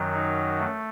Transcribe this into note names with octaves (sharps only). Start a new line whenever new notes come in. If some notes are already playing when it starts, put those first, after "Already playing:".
Already playing: F#2 D#3 F#3
D#4
A3